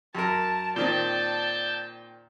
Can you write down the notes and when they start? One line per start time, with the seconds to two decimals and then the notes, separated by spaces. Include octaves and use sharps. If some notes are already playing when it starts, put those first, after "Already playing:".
0.15 F#2 A#4 A5
0.76 A#2 D#3 C4 D5 A5 G6